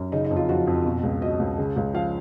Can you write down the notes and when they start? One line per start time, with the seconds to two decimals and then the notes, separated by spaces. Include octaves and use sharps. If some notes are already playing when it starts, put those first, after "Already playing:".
Already playing: F#2
0.12 C#3 D#4
0.25 D#4
0.31 F2
0.36 F4
0.49 F3 F#4
0.67 F2
0.85 B2
1.03 C#2
1.22 F#3 D#5
1.40 C#2
1.58 C#3
1.76 C#2
1.94 F3 F5